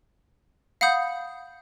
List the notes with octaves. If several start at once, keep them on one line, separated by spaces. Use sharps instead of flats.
F5 F#5 B5 D#6 G6